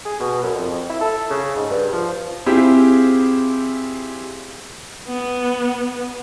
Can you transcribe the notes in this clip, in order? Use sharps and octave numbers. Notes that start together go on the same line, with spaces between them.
G#4
B2
F#2
F2
E4
A4
C#3
G#2
G2
F3
C4 E4 F4 G4 G#4
B3